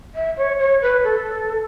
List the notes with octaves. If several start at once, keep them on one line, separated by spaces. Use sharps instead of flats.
E5
C#5
C#5
B4
A4